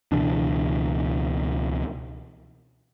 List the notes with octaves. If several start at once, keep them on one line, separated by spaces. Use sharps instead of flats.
C#2 B2 E3 D4